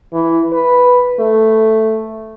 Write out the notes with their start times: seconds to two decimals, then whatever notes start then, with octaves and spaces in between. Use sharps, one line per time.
0.13 E3
0.53 B4
1.19 A3